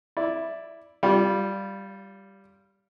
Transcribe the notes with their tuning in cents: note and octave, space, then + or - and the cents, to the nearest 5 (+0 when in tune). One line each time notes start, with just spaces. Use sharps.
E4 +0 D5 +0
G3 +0 F4 -5 D5 -35